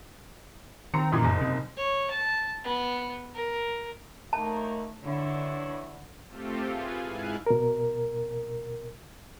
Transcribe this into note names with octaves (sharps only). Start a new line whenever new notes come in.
D#3 C4 A#5 C#7
F#2 A#2 E3 D#4
F#1 F#2
C3
C#5
A5
B3
A#4
D#2 A3 A#3 D#4 A5
G2 D3 E3 E4 C#5
A3 C4 F4 G4 A4
F4 G#4 B4 G#5
G#2 E4 F5 G#5 F#6
B2 A#4